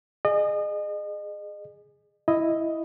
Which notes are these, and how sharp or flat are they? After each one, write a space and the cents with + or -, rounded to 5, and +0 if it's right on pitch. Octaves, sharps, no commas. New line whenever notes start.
G#4 +0 D#5 -35
E4 +0 D#5 +5